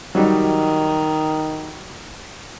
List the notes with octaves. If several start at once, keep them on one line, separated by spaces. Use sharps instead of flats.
D#3 F#3 G3 D#4